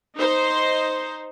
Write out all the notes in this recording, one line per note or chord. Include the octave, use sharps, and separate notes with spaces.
D#4 C5